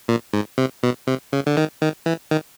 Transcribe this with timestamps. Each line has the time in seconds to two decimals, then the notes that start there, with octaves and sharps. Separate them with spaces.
0.08 A#2
0.33 G#2
0.58 C3
0.83 B2
1.07 C3
1.33 C#3
1.46 D3
1.57 D#3
1.82 D#3
2.06 E3
2.31 D#3